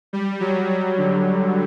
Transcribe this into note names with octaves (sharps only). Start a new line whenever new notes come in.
G3
F#3
F#3
D3